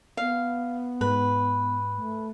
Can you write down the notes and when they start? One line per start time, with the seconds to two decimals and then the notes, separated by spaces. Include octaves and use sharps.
0.17 B3 F5
1.01 G#2 B4
1.96 A3